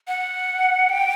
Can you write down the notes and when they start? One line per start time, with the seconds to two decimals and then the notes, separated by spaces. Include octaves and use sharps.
0.08 F#5
0.89 G5